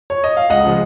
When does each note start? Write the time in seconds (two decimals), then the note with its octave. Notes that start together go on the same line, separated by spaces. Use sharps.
0.10 C#5
0.24 D#5
0.37 F5
0.50 C#2 D#5 F#5
0.64 C#3 F3 G#3